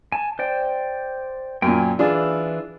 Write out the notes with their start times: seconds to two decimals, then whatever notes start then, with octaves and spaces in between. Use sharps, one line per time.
0.12 G#5 A5
0.39 C5 D5 G5
1.62 F#2 A#2 G5 G#5
1.99 E3 D4 F4 G#4